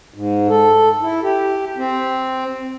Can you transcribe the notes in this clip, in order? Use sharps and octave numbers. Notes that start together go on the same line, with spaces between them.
G#2
A4
E4
G4
C4